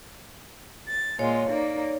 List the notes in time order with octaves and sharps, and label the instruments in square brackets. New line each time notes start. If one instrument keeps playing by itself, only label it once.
[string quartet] A6
[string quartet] A#2 G#3 F4 [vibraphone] C#5
[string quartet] A#3 D#4 D5